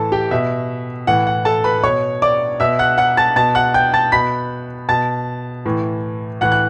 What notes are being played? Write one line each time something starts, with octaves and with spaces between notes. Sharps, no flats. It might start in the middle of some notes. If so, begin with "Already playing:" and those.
Already playing: A2 E3 A4 A5
G4 G5
B2 E5
A2 E3 F#5
F#5
A4 A5
B4 B5
B2 C#5 C#6
D5 D6
B2 E5 E6
F#5 F#6
F#5 F#6
A5 A6
B2 A5 A6
F#5 F#6
G5 G6
A5 A6
B2 B5 B6
B2 A5 A6
A2 E3
A2 E3 F#5 F#6
F#6